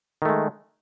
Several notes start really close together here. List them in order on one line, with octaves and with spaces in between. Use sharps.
D#3 A3 G#3